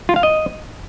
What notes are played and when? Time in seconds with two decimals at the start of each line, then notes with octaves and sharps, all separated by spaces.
0.09 F4
0.16 F5
0.23 D#5